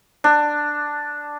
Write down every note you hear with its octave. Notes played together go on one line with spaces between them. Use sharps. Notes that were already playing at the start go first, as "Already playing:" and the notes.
D4